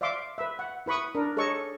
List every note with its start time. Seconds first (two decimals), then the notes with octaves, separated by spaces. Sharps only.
0.01 D5 E5 F5 C6 D6
0.38 B4 E5
0.59 F#5
0.86 E4 B4 B5 C#6 D#6
1.15 D4 A#4
1.37 G#4 A4 C#5 D#5 C#6